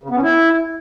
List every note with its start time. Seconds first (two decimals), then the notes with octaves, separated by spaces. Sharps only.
0.03 C#3
0.10 B3
0.16 C#4
0.23 E4